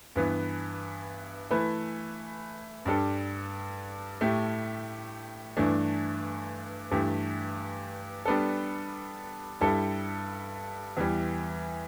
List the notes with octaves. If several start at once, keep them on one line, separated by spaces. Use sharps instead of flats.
G2 E3 B3
E3 A3 E4 B4
G2 G3 D4 A4
A2 A3 G4
G2 E3 A3 D4
G2 E3 A3 G4
G3 B3 D4 A4
G2 G3 E4 A4
E2 E3 G3